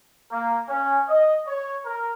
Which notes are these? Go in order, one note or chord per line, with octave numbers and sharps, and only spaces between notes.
A#3
C#4
D#5
C#5
A#4